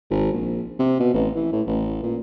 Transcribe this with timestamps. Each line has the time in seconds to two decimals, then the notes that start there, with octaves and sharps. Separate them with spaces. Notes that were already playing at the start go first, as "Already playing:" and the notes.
0.10 G#1
0.33 A#1
0.79 C3
0.99 B2
1.14 A1
1.35 E3
1.52 A2
1.66 A1
2.03 A#2